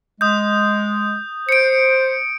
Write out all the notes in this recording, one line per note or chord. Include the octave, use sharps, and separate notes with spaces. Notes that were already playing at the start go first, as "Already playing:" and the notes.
G#3 D#6 G6
C5 C#7 D7